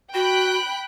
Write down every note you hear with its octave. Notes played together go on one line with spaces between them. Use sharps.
F#4 G5 B5 F#6